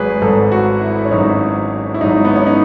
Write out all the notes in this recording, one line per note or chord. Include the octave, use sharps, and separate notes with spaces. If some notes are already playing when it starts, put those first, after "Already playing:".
Already playing: G#1 G#2 F#3 G#4 B4
G#1 G#2 F#3 A4
F#4
E4
C#4
G#1 G#2 F#3 D#4
E4
G#1 G#2 F#3 D#4
B3
C#4
D#4